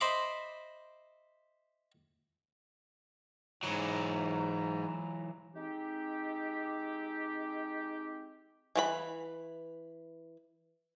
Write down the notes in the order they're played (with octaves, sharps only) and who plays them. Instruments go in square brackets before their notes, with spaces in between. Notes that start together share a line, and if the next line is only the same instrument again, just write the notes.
[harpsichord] C5 D#5 E5 B5 C6 D6
[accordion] G#2 [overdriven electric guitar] E3 F#3 [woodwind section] A#5
[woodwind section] G#3 C4 D#4 G4
[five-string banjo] E3 F#4 B5